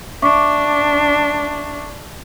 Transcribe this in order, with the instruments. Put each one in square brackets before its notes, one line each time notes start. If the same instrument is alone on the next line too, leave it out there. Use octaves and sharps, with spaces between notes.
[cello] D4 [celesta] E5 C#6 D6